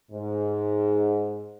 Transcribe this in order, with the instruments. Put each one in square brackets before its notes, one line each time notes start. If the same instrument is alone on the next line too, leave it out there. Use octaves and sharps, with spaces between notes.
[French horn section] G#2